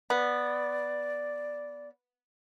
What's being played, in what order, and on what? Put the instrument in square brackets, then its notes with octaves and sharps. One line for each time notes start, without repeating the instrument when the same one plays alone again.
[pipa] B3 [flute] D5